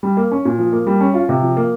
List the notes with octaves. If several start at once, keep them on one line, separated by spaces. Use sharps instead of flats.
G3
A#3
C#4
A#2
F3
A#3
G3
C#4
F4
C3
F3
A#3